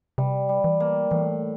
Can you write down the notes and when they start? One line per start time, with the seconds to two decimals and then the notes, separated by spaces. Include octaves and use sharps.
0.18 C3 G3
0.49 G3
0.64 E3
0.80 A#3
1.11 A2 E3